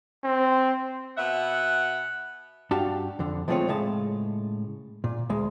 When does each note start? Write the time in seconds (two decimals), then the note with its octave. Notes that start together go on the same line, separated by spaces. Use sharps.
0.24 C4
1.18 B2 E5 F#5
2.71 G2 D4 F#4 G4 F5 A5
3.19 F2 D3
3.48 F3 G#3 A3 C4 F4 C#5
3.68 A2 C#3 G#3 A5
5.04 A#2
5.29 D2 G#3